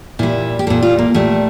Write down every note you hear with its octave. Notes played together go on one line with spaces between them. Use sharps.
A#2 G3 E4
G4
A#2 G3 A4
F4
A#3
A#2 G3 A3